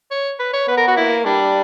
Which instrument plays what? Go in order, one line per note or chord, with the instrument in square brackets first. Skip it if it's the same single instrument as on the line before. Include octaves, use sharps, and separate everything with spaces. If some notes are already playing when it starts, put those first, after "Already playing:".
[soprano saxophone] C#5
B4
C#5
[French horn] B3 [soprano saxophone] B4
[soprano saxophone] A#4
F#4
[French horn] A#3 [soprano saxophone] E4
[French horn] G3 [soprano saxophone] D4